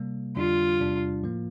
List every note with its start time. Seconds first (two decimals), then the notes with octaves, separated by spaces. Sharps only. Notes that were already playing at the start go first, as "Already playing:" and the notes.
Already playing: C3 G3 A#3
0.36 F2 D3 G3 D4 F4
0.80 E2 C3 G3 D4
1.24 A2 F3 A#3